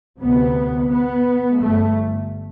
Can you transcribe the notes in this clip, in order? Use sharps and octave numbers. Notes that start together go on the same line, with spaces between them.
D2 C3 B3
B3
G1 G2 A3